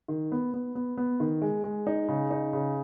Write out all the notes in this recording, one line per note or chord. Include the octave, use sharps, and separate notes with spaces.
D#3
B3
B3
B3
B3
D#3
G#3
G#3
D#4
C#3
D#4
C#3